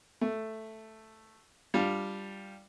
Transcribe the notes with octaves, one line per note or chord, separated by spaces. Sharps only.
A3
G3 D4 F4